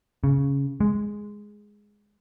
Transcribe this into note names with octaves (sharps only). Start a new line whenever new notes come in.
C#3
G#3